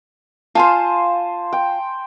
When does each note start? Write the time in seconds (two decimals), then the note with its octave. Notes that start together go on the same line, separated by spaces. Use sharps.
0.55 F4 C5 F5 G#5 A5
1.53 G5